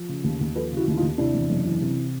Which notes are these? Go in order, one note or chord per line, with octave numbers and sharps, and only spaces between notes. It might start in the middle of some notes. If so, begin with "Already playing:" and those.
Already playing: F3
C#3
D#2
D#2
F3 A4 B4
C#3 E4 F#4
D#2 E4
D#4 F4
D#2
C3 D4 E4
E2
F#1
E3
C3